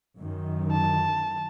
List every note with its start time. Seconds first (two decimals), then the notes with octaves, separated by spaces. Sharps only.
0.19 F#2 D#3
0.72 A5